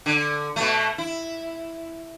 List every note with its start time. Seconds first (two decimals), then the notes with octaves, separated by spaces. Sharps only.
0.06 D3
0.56 B2 A3
0.98 E4